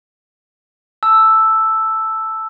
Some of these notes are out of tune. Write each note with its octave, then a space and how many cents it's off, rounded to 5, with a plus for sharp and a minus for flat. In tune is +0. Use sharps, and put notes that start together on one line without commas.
A5 +0 E6 +0